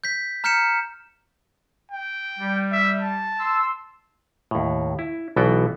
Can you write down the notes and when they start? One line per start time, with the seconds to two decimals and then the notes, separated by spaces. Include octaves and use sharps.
0.04 G6 B6
0.44 A#5 F6 G6 B6 C#7 E7
1.92 G5
2.39 G3
2.72 E5
3.01 A5
3.39 C6 E6
4.51 D#2 A2
4.99 E4
5.36 B1 B2 E3 B3 F#4 G5